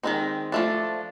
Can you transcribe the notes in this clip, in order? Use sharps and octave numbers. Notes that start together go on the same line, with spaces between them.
D#3 G#3 C4 D#4
F3 A3 D4